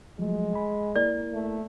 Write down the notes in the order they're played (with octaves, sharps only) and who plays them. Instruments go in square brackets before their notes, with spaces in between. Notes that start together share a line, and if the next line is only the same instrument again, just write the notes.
[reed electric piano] F3 F#3 A3 [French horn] G#3
[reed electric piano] G#5 B5
[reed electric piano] A#3 E4 A#4 [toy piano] D5
[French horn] A3